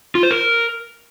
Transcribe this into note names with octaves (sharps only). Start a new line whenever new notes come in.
F4
C5
A#4